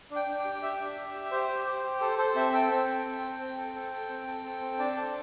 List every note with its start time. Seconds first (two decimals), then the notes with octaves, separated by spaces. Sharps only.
0.10 D4
0.16 G5
0.27 D4
0.39 G5
0.45 G4
0.62 G4 E5
0.80 D4
0.97 G4
1.14 G4
1.31 G4 C5
1.49 G4
1.66 G4
1.83 G4
2.01 A4 C5
2.18 A4 C5
2.35 C4 E5
2.53 A4 G5
2.71 C4 G5
2.88 A4
3.05 C4
3.22 C4
3.40 C4
3.57 A4
3.75 A4
3.92 A4
4.09 C4
4.27 A4
4.44 A4
4.61 C4
4.79 D4 A5
4.97 A4